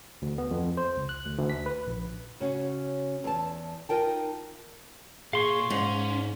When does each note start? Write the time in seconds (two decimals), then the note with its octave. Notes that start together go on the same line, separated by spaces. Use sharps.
0.22 D2
0.38 B3
0.51 F2
0.77 C5
0.97 C#2
1.09 F#6
1.26 D2
1.38 D2
1.50 B6
1.66 B4
1.87 A#1
2.40 C#3 C#4 F#4
3.24 E2 A5
3.89 D#4 F4 A#4 G5 A5
5.33 A#2 G#4 F5 C6 C#6
5.70 G#2 G#3 C#4